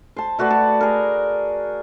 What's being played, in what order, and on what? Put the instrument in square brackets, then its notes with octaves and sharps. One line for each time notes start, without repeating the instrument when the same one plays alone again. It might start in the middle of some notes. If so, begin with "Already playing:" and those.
[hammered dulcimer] C5 A5
A3 F#4 B4 D5
A5
G#4 A#4